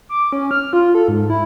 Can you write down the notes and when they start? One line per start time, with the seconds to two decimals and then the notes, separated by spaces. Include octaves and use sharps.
0.09 D6
0.33 C#4
0.51 F6
0.73 F4
0.95 A4
1.08 G#2
1.30 E4